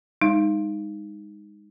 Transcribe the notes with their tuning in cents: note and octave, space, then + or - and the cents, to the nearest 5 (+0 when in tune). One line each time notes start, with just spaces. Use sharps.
G#3 -35 D#4 +0